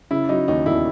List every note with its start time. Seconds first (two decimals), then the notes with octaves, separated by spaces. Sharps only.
0.11 C#3 E4
0.29 F#3 D#4
0.48 D#2 D#4
0.66 E1 E4